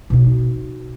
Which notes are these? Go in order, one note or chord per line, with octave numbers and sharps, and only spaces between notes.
B2 D#4